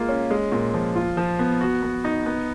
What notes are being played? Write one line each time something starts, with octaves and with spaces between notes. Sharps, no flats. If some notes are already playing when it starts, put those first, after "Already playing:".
Already playing: G#3 A#3 F4
C#4
G#3
A#2
F3
F4
F3
B3
F#4
B3
D#4
B3